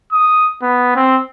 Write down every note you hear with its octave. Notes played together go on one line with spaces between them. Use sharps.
D#6
B3
C4